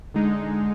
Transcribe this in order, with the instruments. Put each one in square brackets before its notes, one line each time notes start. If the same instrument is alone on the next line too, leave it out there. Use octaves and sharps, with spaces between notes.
[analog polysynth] D3 G#3 D#4